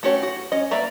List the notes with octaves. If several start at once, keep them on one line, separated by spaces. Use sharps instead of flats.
A3 C#4 F#4 G4 C#5
F#4
C#4 D#5
A#3 B4 D5 E5 A#5